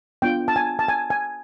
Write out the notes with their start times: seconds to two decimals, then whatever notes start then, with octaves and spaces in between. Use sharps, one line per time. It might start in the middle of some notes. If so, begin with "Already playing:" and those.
0.22 B3 D4 F4 G5
0.48 A5
0.56 G#5
0.79 A5
0.88 G#5
1.10 G#5